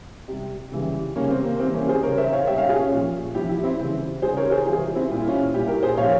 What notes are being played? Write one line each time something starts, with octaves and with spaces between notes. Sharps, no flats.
C3 G3
C#3 E3 G3
C#3 G3 A#3 C#4
C4
A#3
C3 E3 G3 C4
A#3 C#4
G#4 C5
C#3 G3 A#4 C#5
C5 E5
C#5 F5
C3 G3 E5 G5
C#5 F5
F4 G#4
C#4 F4
A#2 F3
C3 F3 E4 G4
E4 G4
C4 E4
C#3 E3 G3
C#3 G3 G#4 C5
A#4 C#5
G#4 C5
C3 E3 G3 F4 G#4
C4 E4
A#2 G3 F4
E4
C#4 F4
A#2 G3 E4 G4
G4 A#4
G#4 C5
A#2 F3 C#5 F5